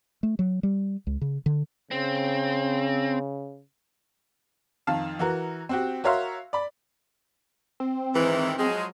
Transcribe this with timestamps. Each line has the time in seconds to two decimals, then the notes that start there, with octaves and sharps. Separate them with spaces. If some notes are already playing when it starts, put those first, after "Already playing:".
0.23 A3
0.39 F#3
0.63 G3
1.07 C#2
1.21 C#3
1.46 D3
1.91 C#3 C4
4.87 F2 D#3 F5 A5
5.19 E3 F#4 A#4
5.69 C4 F#4 G4
6.04 F#4 A#4 C#5 E5 F5 C6
6.53 D5 B5
7.80 C4
8.14 G#2 D#3 E3
8.58 F3 F#3 G#3